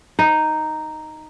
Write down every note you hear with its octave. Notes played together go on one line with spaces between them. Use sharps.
D#4